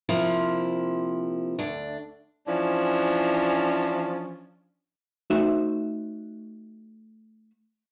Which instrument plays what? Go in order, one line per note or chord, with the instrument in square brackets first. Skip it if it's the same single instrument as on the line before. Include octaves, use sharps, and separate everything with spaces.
[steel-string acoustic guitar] C3 F3 A#3 E4
D2 D4
[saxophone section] E3 F3 C#4 D4
[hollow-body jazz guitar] A3 D#4 F#4 C5 E5